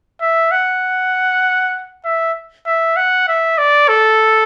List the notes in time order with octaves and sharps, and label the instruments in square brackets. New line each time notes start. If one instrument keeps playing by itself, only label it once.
[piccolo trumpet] E5
F#5
E5
E5
F#5
E5
D5
A4